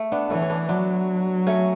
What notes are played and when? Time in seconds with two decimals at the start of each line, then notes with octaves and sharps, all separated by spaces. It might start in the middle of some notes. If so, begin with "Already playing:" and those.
Already playing: A3
0.12 B3 D4
0.30 E3 A3 C#4
0.42 C#4
0.50 B3 D4
0.69 F#3 B3 D4
1.47 A3 C#4